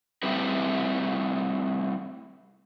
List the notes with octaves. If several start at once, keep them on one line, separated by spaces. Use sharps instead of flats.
G3 A3 C4 E4 G#4 B4